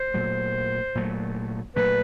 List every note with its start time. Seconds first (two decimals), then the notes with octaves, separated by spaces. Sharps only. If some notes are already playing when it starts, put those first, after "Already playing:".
Already playing: C5
0.14 A#2 F#3 A3
0.95 A#2 F#3 A3
1.76 A#2 F#3 A3 B4